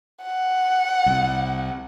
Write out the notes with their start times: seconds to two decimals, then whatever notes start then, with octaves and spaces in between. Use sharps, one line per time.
0.23 F#5
1.06 C2 C3